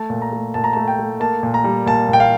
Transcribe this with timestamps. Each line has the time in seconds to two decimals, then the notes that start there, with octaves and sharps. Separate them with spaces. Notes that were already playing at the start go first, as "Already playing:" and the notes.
Already playing: A3 A5
0.10 A#2
0.22 A#5
0.32 A3
0.54 A#2 A5
0.64 A#5
0.73 A3 A5
0.88 G5
0.99 A3
1.20 A#3 A5
1.43 A#2
1.54 A#5
1.64 G3
1.86 A#2 A5
2.08 A#2 G5
2.20 F5